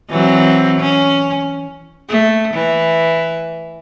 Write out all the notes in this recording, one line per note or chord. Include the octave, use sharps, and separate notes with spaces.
E3 F#3 C4
C#4
A3
E3